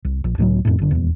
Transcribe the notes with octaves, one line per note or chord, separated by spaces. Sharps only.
C2
A#1
C#2 A2 E3 F#3
F2 A2
F#1 D3
D#1 E2